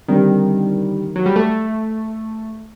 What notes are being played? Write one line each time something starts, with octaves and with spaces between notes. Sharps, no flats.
D3 D#3 G3 C4 G4
F#3
G3
A3